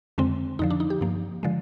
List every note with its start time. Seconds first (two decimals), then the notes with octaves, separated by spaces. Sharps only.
0.18 F2 D3 G#3 C4
0.59 F2 D3 F3 D#4
0.70 D4
0.80 D#4
0.90 G4
1.01 G2 F3 A#3
1.43 D3 F3 G#3